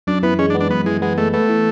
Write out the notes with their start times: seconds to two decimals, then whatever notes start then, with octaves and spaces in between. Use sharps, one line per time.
0.07 F#2 D4
0.23 E3 B3
0.39 G#3 C#4
0.50 D4
0.55 B3
0.60 D4
0.70 F#2 B3
0.86 E3 G#3
1.02 G#3 B3
1.18 G#3 A3
1.33 A3 B3
1.49 E3